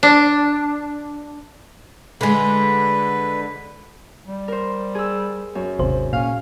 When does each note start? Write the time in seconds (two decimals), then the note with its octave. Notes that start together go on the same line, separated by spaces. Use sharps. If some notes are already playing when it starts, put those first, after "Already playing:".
0.03 D4
2.21 D3 G#3 B4
4.26 G3
4.48 A#4 C5
4.95 G#4 E6
5.55 F#2
5.79 G#1 D#2 C3 C5
6.13 A#2 C#4 F5